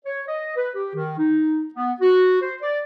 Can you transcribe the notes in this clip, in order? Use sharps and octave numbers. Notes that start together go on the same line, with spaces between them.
C#5
D#5
B4
G4
D#3
D#4
B3
F#4
C5
D5